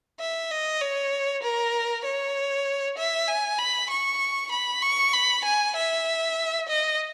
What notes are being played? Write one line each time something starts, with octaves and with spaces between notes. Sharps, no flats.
E5
D#5
C#5
A#4
C#5
E5
G#5
B5
C#6
B5
C#6
B5
G#5
E5
D#5